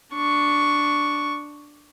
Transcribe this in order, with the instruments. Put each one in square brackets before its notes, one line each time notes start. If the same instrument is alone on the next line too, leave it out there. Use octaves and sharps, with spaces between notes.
[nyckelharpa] D4 C#6